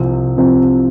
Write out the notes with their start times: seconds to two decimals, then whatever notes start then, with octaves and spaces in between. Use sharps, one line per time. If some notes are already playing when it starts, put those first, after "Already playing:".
Already playing: C2 C3 F3 C4
0.37 C2 C3 F3 C4